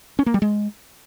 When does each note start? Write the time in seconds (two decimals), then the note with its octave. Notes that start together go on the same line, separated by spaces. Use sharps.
0.19 C#4
0.26 A#3
0.34 G3
0.42 G#3